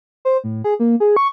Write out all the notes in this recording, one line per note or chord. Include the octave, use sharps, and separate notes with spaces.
C5
A2
G#4
A#3
G#4
C#6